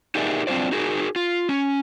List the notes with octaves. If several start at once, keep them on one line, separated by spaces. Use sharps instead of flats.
D#4 G4 G#4 A#4 D5 E5
F#3 C4 D4 F4 C5 D5
D#4 F#4 G#4 A#4
F4
C#4